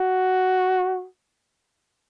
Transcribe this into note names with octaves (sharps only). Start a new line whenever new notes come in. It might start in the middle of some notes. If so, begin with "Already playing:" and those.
Already playing: F#4